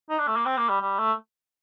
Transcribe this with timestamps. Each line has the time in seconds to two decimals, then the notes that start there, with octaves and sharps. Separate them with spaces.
0.10 D#4
0.19 D4
0.28 A3
0.36 A#3
0.46 C4
0.57 A#3
0.69 G3
0.81 G3
0.99 A3